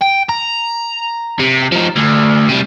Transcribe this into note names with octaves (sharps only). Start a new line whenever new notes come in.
G5
A#5
C3
F3 D#4
D2
C3 G3